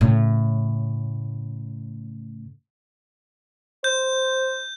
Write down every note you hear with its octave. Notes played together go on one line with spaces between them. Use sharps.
A2 C#3
C5 G6